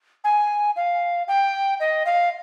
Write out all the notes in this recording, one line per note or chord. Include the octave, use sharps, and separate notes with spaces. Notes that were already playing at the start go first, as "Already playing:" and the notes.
G#5
F5
G5
D#5
F5